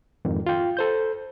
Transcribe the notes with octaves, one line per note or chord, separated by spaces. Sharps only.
F2 G#2 D#3
F4 G5
A4 C5 G6